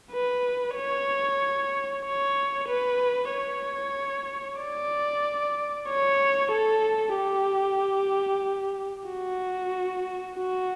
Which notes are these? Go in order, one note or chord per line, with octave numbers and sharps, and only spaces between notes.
B4
C#5
C#5
B4
C#5
D5
C#5
A4
G4
F#4
F#4